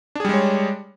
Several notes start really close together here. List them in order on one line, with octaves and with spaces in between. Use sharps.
D4 G#4 G3 G#3 C#5